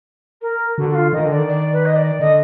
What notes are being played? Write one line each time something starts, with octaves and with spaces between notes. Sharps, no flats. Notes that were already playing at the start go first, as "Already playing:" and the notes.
A#4
D3 F#4
F#4
F4
D#3 D#5
D3 D5
D#3
D5
B4
D#5
D5
D3 D#5